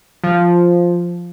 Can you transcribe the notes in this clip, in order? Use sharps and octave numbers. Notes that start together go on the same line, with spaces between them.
F3